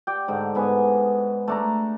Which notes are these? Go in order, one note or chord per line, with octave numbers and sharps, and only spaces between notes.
G4 D5 G5
G#2 D3
G#2 B3 G#5
A3 D4 A#5